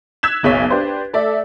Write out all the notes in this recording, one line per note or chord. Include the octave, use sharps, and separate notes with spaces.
E6 F#6 G#6 B6 E7
F#1 B1 G#4 C#5 B6
D4 G4 B4 C5
A3 A4 D5 E5